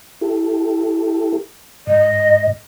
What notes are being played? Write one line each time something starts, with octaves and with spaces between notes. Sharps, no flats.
E4 G4 A4
G#2 D#5